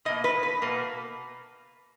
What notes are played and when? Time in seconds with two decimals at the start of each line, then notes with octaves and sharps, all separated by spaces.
0.05 B2 A#3 D#5
0.24 B4
0.43 B4
0.62 B2 A#3